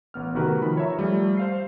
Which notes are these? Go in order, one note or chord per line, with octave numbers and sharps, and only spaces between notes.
A1 B3 F6
C3 D#3 A3 F#4 A#4 B4
D#3 F3 B5
C#5 E5 A#5
F3 G3 A3
C5 F5 C7